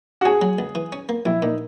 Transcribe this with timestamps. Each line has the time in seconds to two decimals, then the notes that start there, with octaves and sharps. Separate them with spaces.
0.21 F#4
0.25 C#4 G#4
0.42 F#3
0.59 C#2
0.75 E3
0.92 C#4
1.09 A#3
1.26 A#1 E4
1.42 A#2 D#4